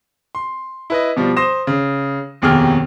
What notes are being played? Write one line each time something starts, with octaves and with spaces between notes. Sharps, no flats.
C6
E4 B4 D#5
B2 F3 G3
C5 C6 D#6 A#6 E7
C#3
F1 D#2 B2 G#4 G5 F6